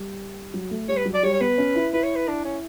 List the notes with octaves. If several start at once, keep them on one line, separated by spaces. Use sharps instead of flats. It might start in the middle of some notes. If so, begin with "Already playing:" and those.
Already playing: G3
F#3
A3
G3 C#5
B4
F#3
D5
G3 C#5
C#5
B3 B4
C#4
E4
E4 B4
C#5
B4
D4
C#4